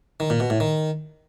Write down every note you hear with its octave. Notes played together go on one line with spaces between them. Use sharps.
D#3
A#2
B2
A2
D#3